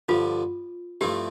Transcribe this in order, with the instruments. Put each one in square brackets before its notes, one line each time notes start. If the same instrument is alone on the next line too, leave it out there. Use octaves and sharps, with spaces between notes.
[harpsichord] G2 D3 F3 [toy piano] F4
[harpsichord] G2 F3 A3 C4 E4 [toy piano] G4